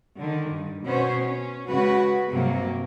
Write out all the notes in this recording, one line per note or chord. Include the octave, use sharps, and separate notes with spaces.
D3 D#3
G2
B2 B3 C#4 C5 C#5
C#4
C#3 G#3 F#4 B4
G2 C3 F#3 A#3